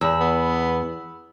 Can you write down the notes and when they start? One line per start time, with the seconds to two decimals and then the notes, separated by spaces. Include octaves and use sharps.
0.01 E2 B5 E6
0.20 B3